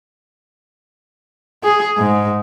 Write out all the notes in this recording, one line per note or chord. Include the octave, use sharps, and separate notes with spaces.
G#4
G#2